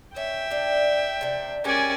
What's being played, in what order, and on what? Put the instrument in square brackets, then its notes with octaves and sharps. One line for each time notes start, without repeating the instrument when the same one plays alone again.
[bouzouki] C#4 [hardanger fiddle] E5 [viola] G5
[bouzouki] D4 G4
C3 D4
[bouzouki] G#3 G4 [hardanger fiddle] C#4 D5 [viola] A#4 G#5